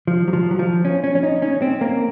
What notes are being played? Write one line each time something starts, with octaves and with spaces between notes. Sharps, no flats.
F3
F#3
F3
F#3
F3
C#4
C#4
C#4
D#4
C#4
C4
A#3